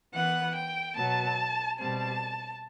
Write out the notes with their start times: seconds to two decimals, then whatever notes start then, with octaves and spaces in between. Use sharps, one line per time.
0.14 E3 B3 F#5
0.54 G5
0.96 B2 F#3 B3 A5
1.78 B2 G3 C4 A5